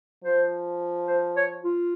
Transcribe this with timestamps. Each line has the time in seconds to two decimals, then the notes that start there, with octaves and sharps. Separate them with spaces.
0.24 F3 C5
1.08 C5
1.36 C#5
1.64 F4